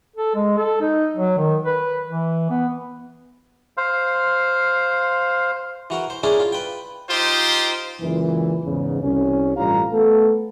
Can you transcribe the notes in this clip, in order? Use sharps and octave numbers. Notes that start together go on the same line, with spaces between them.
A4
G#3
A4
D#4
F#3
D#3
B4
E3
B3
C5 F5
E3 F#4 A#4
C5
C#4 D4 E4 G#4 A#4 C5
F4
B4 G5
D#4 F4 G4 C5
C#2 F#2 A#2 E3
E2 G#2 C#3
C2 C#4
A1 G2 G3 F4 F5 A#5
A3 B3 A4